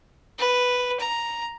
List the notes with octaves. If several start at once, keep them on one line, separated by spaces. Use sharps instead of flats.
B4
A#5